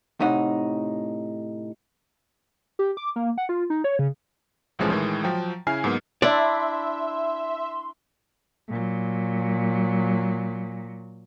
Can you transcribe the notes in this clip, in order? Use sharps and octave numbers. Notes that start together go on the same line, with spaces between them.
A2 C3 D#4 F#5
G4
D6
A#3
F#5
F4
D#4
C#5
C#3
B1 A2 E3 F3 G#3 C#4
A2 D#3 E3 G#3
F3 F#3 G5
C#3 E4 G#5 F6 C7
G#2 F#3 A#3 B3
D4 E4 D5 E5 C6
A#2 F#3